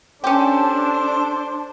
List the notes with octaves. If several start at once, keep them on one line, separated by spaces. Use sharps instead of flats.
C#4 D4 G4 A4 C5